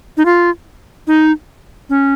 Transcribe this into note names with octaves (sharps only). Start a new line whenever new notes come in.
D#4
F4
D#4
C#4